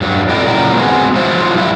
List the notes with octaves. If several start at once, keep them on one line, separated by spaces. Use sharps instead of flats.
G2 F#3
C4 E4 A4 D5 D#5 G5
A#2 C#3 F#3 A#4
G#3 B3 C4 F4 F#4 G#4
F3 F#3 E4 F4 C5
G2 G3 E4 E5